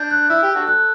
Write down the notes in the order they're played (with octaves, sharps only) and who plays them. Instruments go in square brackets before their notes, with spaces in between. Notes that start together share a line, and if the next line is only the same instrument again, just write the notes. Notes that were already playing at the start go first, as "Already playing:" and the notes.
Already playing: [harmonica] D4 [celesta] G6
[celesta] F#6
[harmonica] E4 [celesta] E6
[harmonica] G4
D4 F#4 A4
[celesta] F#6